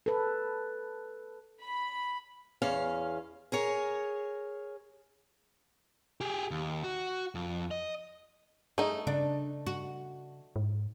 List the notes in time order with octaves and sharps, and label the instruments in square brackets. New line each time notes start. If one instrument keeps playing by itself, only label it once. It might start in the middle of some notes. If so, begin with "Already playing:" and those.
[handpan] A4 B4
[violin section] B5
[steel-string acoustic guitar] E2 C#4 F5
G#4 A#4 C#5
[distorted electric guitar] G4 G#4
D#2
F#4
F2
D#5
[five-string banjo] A3 D#4 [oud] G#4
[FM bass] C#3 [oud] D4
[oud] F#4
[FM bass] G#2